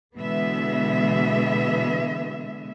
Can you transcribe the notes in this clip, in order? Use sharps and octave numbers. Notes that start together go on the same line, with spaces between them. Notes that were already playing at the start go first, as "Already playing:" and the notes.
B2 D3 E3 G#3 B3 E5